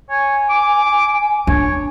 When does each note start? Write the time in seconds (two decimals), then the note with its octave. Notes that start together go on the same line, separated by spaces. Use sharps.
0.10 C#5 G#5
0.49 D6
1.47 D4 C#5